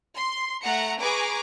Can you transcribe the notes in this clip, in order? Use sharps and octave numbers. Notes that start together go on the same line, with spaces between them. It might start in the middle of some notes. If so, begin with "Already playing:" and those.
C6
A3 F#5 A#5 C#7
G#4 B4 G#5 A#5 C#6 D6